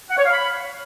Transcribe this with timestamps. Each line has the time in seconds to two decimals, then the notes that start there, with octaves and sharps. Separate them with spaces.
0.10 F#5
0.18 C#5
0.25 F5
0.33 B5